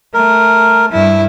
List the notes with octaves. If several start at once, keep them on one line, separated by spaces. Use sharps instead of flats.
A3 A#4
G2 E4